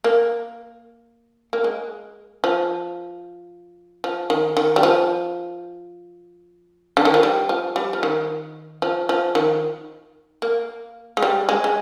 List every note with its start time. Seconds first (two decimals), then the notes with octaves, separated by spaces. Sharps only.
0.04 A#3
1.53 A#3
1.64 G#3
2.44 F3
4.04 F3
4.30 D#3
4.57 D#3
4.76 G3
4.83 F3
6.97 D3
7.05 D#3
7.14 F3
7.23 G3
7.49 F3
7.76 G3
7.93 F3
8.03 D#3
8.82 F3
9.09 F3
9.35 D#3
10.42 A#3
11.17 G#3
11.23 G3
11.49 G#3
11.64 G#3